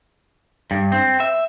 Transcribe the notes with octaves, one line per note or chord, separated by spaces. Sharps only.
G2
C4
E5